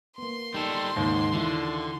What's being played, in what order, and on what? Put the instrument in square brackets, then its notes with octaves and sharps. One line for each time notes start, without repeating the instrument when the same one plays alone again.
[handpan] A#3 B3 [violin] C6
[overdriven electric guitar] G3 A4 [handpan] D#4
[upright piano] D#2 [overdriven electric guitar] G#2 [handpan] C#3
[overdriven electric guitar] D3 [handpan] E3 E4 F4